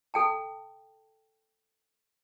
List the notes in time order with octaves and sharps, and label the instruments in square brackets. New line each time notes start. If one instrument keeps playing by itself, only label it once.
[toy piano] A4 G5 A5